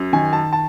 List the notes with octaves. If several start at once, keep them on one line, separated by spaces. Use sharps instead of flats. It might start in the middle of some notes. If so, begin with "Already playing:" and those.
Already playing: F#2
D#3 G#5
A5
A5